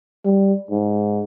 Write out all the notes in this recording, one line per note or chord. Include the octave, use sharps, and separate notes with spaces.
G3
G#2